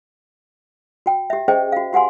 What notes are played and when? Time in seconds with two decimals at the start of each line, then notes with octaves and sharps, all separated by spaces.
1.06 F#4 G5
1.30 G4 E5
1.48 C#4 G#4 C5 D#5 G5
1.72 F#4 F5
1.93 F#4 G4 F#5 G#5 C6